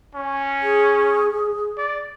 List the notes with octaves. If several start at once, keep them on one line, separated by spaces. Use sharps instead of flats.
C#4
G#4
D5